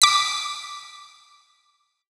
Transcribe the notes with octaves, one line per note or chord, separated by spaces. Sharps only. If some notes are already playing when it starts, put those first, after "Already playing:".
D6 B6